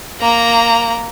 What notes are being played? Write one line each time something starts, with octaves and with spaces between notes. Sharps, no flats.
A#3 A#5